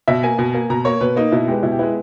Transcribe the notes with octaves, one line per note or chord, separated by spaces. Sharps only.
B2 E5
A#3 G#5
B2
A#3
B2 A#5
A#3 C#5
B2 B4
A#3 D#4
B2 E4
G#3 B3 G4
B2 E4
G4
G#3 B3 E4